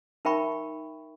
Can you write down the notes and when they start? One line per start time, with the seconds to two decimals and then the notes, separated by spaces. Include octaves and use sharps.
0.25 D#4 A#4 E5 G5 B5 C#6